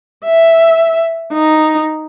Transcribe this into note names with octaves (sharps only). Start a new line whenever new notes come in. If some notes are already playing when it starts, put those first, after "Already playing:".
E5
D#4